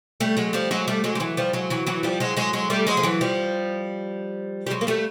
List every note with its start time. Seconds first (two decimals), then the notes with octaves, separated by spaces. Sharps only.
0.20 G3 A3
0.37 F#3 G#3
0.53 F3 G3
0.71 F#3 G#3
0.88 G3 A3
1.04 F#3 G#3
1.15 G3
1.20 E3 F#3
1.37 F3 G3
1.53 F#3 G#3
1.70 E3 F#3
1.87 E3 F#3
2.03 F3 G3
2.20 F#3 G#3
2.37 F#3 G#3
2.53 F#3 G#3
2.70 G3 A3
2.87 F#3 G#3
2.97 F3
3.03 E3 F#3
3.21 F3 G3
4.67 G3
4.70 F#3 G#3
4.81 A#3
4.87 G3 A3